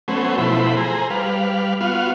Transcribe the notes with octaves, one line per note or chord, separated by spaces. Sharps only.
F#3 A3 B3 C#4 C5
B2 F3 A3 E4 C5 B5
G#4 C5 A#5
G3 B4 F5
B3 F4 F#4 F5